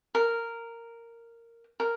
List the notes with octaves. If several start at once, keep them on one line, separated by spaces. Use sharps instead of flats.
A#4
A#4